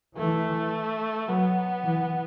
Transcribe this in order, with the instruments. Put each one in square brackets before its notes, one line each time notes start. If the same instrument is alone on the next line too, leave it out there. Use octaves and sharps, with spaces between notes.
[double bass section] E3 [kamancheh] A3
[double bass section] F#3 [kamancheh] B3
[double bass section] E3